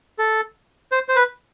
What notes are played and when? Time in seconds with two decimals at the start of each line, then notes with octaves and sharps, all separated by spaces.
0.19 A4
0.92 C5
1.09 C5
1.16 B4